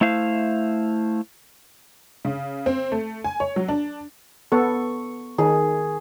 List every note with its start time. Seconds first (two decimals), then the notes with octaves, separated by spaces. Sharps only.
0.01 A3 E4 C5 F5
2.25 C#3
2.66 C4
2.92 A3
3.24 G#5
3.40 C#5
3.56 F#3
3.68 D4
4.52 B3 A4 C#6
5.38 D#3 G#4